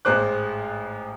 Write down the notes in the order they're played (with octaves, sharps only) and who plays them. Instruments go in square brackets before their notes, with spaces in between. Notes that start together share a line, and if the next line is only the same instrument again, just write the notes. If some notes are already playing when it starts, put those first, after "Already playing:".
[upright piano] A1 G#2 G#3 C5 D6 F#6